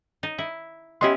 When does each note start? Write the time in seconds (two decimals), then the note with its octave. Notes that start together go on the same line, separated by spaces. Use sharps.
0.23 D#4
0.38 E4
1.01 B3 C#4 E4 G4 D#5 C6